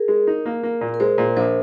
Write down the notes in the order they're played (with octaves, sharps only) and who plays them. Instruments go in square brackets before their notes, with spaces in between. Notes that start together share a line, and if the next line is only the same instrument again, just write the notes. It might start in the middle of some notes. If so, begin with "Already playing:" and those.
Already playing: [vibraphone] G#4 A#4
[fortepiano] G#3
D#4
A#3
A#3
A#2
[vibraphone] A#4
[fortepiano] G#3 [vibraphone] C5
[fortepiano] A#2
[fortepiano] A#1 [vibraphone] C5